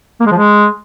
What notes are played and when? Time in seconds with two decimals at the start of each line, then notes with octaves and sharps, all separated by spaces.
0.21 A#3
0.26 G#3
0.32 F3
0.37 G#3